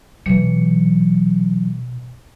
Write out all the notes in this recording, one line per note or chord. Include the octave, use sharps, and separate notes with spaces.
B2 E3 F#3 C#7